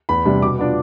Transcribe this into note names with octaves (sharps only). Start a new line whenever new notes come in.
E2 B5
C3 G3 D4
B2 D6
B3 D4 F4